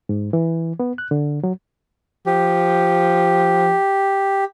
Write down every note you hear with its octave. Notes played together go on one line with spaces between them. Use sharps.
G#2
E3
B3
F#6
D3
F#3
F3 G4